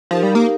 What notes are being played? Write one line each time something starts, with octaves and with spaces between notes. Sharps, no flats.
F3 D#4 G4 A#4 F5
G3
A#3